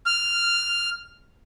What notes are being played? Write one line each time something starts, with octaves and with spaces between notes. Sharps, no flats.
F6